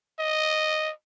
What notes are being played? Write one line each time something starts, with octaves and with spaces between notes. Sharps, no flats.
D#5